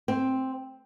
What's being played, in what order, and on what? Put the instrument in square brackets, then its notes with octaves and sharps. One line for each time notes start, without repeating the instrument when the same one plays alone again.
[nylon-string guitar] C4